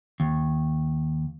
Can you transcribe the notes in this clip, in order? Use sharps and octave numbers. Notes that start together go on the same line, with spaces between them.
D#2